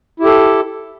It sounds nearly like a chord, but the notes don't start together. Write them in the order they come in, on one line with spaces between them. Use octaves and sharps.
E4 G4 A4